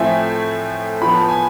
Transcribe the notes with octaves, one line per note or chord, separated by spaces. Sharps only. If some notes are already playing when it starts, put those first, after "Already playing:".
Already playing: A2 F3 A3 C4 E5 G#5
A2 F3 B3 B5
A5
G#5